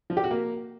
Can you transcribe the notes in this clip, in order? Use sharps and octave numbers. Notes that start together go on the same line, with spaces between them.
F3
G4
F#4
A#3